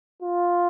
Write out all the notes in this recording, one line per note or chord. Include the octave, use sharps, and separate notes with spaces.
F4